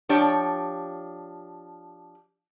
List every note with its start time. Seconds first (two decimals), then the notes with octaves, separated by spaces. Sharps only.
0.09 F3 D4 G4 C#5